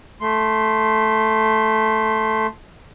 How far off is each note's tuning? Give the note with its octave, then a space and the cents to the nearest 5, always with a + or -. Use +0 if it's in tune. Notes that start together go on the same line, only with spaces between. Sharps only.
A3 +0 C6 +0